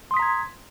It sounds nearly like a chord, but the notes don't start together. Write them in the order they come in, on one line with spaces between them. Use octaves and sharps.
C6 D#6 B6 A#5 G#6